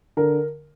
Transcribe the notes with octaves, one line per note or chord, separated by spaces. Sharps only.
D3 A#4